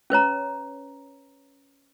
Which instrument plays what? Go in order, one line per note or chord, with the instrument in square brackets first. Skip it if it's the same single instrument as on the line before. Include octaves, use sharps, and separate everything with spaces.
[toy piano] C#4 B4 C#5 A#5